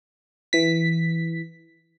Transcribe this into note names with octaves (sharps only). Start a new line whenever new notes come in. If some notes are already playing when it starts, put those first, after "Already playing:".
E3 B6